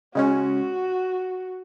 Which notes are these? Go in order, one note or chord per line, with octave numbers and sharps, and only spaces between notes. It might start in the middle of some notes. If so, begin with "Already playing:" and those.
C#3 G#3 C#4 F#4